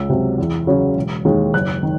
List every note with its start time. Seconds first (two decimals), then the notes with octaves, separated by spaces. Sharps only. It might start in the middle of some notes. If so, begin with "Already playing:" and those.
Already playing: C#2 E6
0.10 C3 F#3
0.38 E2
0.67 C#3 F#3 C#4
0.96 E1
1.25 D#2 D#3 G#3
1.54 F#1 F#6
1.83 D#3